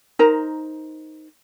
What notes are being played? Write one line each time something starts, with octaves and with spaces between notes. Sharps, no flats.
D#4 A#4 C5 A#5